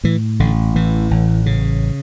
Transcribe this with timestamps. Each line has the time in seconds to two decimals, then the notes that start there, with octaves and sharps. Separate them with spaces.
0.04 A2 E3
0.40 A1 D3
0.75 A2 E3
1.11 A1
1.46 C#3